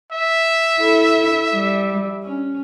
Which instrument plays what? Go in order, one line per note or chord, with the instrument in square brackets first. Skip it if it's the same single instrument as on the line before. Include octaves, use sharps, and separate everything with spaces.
[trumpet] E5
[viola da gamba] E4 A4
G3
C#4